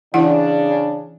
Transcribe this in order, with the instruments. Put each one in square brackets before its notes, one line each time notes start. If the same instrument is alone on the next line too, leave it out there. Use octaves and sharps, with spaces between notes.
[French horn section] C#3 D4 [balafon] E3 E4 F#5